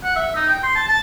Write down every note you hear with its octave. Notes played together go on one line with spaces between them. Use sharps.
F#5
E5
D#4
G5
C6
A5
A5